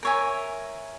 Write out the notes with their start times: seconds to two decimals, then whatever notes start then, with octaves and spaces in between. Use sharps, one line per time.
0.03 A#4 C#5 E5 G#5